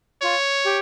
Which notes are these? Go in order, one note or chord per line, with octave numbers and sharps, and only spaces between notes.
F4 C#5
G4